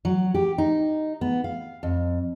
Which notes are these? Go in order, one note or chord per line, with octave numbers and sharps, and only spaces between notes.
F#3
G4
D#4
B3
F5
F2